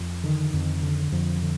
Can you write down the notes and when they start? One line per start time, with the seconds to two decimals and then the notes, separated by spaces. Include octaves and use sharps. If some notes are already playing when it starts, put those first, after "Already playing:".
Already playing: F2
0.24 D3 D#3
0.53 F2
0.83 D3
1.12 F2 F3
1.42 D3